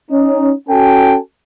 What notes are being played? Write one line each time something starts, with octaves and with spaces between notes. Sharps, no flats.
C#4 D#4
C#4 F#4 A4 G5 G#5